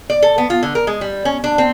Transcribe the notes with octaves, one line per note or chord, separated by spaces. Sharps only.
D5
A4
B3
F4
D3
A#4
G#3
G3
C#4
D4
C4